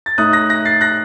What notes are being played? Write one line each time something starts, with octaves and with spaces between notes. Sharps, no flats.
A6
A2 A3 D#4 D#6 F#6
F#6 A#6
F#6 A#6
A6 C7
F#6 A#6